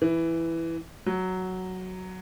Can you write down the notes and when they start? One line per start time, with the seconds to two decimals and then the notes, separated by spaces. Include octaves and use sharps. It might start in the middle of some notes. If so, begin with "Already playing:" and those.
0.02 E3
1.06 F#3